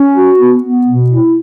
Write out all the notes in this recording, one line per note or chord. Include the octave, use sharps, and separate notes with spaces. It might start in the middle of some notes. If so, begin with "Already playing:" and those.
Already playing: C#4
F#4
B3
B3
B2
E4